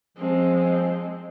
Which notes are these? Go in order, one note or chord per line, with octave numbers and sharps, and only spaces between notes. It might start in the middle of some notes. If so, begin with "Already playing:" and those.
F3 G#3 C4